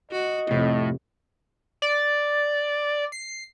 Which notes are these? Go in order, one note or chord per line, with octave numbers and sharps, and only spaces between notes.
F#4 D#5
F2 A2 C3
D5
C7